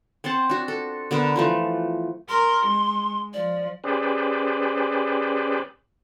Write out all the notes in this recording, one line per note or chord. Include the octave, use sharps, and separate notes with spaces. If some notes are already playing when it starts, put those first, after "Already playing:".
C4 C5 F#5 A5
D4 F#4
A4
D3 B3 A#4
E3 F3 A3
A#4 C6
G#3
F3 D5
C#4 G4 G#4 B4 C5 D5